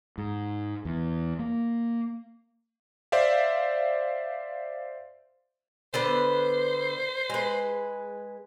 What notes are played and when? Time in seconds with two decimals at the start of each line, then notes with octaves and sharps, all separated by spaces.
0.18 G#2
0.85 E2
1.39 A#3
3.12 C5 D5 E5 F5
5.94 D3 B3 B4 C5
7.30 G#3 B4